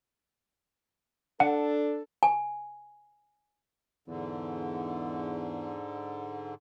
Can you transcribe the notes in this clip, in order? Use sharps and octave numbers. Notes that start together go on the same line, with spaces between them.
D4 A4 F#5
G#5
E2 G#2 D3